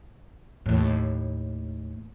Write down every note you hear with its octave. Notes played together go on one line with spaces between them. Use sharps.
D#2 A2